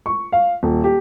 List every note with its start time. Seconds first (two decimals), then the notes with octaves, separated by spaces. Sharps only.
0.06 C#6
0.32 F5
0.63 D#1
0.84 G4